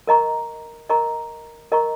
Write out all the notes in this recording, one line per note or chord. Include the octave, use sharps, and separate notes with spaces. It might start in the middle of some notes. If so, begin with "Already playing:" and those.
A#4 D#5 A#5 C#6
A#4 D#5 A#5 C#6
A#4 D#5 A#5 C#6